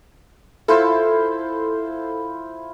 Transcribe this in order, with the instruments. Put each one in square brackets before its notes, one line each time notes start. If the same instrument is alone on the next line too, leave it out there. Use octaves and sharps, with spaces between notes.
[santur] E4 F4 C5 [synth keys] A4